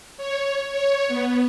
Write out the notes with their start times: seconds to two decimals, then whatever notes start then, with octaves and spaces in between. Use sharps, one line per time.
0.17 C#5
0.72 C#5
1.08 B3